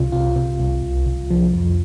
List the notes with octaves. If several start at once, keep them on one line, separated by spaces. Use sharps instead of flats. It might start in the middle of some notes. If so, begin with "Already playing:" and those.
Already playing: C2 C3 F4
C3 F4
C3
C2
C2
C2
F3
F2